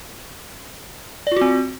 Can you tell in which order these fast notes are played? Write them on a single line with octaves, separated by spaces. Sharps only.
D5 F4 F#4 C4